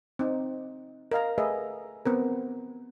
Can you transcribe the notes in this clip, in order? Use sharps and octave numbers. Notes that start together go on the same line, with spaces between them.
C4 D#4
A#4 D#5 F5 A#5
A3 G#4 A#4 B4 D#5 E5
B3 C4 A#4